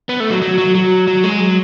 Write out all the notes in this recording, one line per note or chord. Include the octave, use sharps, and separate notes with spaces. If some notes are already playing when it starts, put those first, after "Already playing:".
B3
A3
F#3
F#3
F#3
F#3
F#3
G#3
F#3